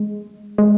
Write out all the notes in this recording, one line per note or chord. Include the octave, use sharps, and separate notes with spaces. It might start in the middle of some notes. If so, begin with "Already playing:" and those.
Already playing: G#3
G#3